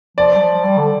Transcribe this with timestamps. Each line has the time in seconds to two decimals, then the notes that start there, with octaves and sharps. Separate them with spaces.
0.17 F3 D5
0.36 G3
0.41 F3
0.64 G3
0.78 D3